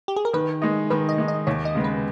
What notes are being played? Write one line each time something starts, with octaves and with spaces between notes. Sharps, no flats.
G4
G#4
A#4
D#3 B4
G#3 D#4
D#3 B4
D#5
G#3 D#4
D#5
D#2 C#5
D#5
C#3 G#3 B3
B4